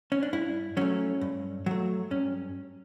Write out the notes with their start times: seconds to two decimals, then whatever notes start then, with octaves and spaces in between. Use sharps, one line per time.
0.12 C#4
0.23 D4
0.33 G2 E4
0.77 F#3 A3 C#4
1.21 G2
1.66 F#3 A3
2.11 G2 C#4